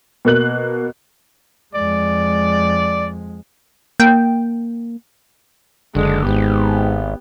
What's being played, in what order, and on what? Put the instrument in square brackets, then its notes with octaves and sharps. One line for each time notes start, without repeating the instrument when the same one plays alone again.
[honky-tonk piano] B2 A#3 F#6 F#7
[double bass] F2 G#3 [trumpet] D5
[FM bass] A#3 [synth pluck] G5
[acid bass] F#1 [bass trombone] D3 [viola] G#3 D4
[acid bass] G#1 [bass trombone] G#2 [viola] B3 G4